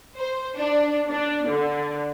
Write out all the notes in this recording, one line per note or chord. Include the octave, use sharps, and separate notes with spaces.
C5
D4
D4
D3